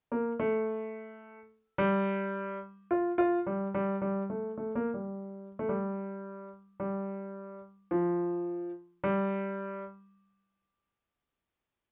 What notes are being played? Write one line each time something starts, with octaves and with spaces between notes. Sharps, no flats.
A#3
A3
G3
F4
F4
G3
G3
G3
A3
A3
A#3
G3
A3
G3
G3
F3
G3